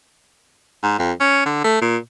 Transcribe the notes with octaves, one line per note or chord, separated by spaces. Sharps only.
G#2
F2
C#4
D3
A3
A#2